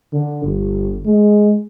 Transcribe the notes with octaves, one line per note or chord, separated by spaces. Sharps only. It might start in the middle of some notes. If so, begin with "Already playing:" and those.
D3
G1
G#3